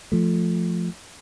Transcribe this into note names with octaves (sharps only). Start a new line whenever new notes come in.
F3 A3